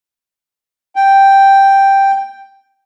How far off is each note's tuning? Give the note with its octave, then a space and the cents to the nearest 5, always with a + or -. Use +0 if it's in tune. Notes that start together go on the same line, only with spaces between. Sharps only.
G5 +0